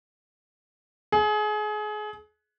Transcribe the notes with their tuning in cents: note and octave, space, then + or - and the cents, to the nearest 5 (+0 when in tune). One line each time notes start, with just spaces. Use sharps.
G#4 +30